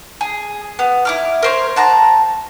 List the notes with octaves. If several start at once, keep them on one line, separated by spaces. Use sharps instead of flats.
G#4
B3
E4 D6 F6
A#4 C5 C#5
F#5 A5 A#5